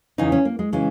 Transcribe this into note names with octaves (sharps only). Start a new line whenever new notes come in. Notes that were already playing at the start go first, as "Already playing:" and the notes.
E2 C#3 E3 D#4
C#4
A#3
G#3
C#3 E3 G#3